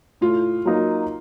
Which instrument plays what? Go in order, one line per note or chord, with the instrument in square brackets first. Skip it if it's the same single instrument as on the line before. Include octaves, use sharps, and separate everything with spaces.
[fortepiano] A2 [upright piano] F4
[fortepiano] F#3 A#3 D#4